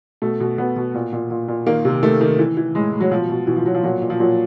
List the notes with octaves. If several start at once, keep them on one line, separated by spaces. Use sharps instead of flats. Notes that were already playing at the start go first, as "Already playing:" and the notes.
B2 A3
B2
B2 B3
B2
A#2
A#2
A#2
A#2
D#3 A#3
C3
D#3 A3
D#3
E3
E3
A2 G#3
A2
F#3
B2 F3
B2
B2 E3
F3
B2 F#3
F3
A#2 F#3
A#2
F3
A#2 F#3